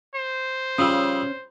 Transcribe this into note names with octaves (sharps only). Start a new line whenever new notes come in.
C5
C#3 F3 G3 C#4 D#6 E6